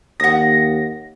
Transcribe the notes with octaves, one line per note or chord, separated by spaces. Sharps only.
D#2 F#5 D#6 A#6